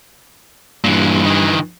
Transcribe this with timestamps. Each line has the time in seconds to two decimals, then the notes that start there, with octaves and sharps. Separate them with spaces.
0.84 G2 A#2 E3
1.26 D#3 E3